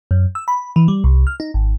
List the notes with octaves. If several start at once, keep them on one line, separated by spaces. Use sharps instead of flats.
F#2
E6
B5
E3
G3
C2
F6
D#4
G#1